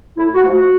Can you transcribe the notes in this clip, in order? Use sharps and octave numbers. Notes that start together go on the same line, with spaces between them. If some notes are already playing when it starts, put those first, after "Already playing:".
A2 E4
F#4
F3 A3
F#4